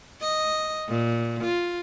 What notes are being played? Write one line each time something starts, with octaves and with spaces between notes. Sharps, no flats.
D#5
A#2
F4